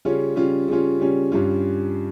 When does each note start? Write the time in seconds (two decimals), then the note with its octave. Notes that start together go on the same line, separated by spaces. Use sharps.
0.05 C#3 G3 C#4 F4
0.36 C#3 G3 C#4 F4
0.68 C#3 G3 C#4 F4
0.99 C#3 G3 C#4 F4
1.32 G2 G3 C#4 F4